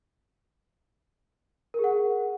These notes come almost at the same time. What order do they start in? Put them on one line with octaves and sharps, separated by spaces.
A#4 G#4 F#5